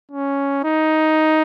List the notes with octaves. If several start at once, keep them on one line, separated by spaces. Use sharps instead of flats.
C#4
D#4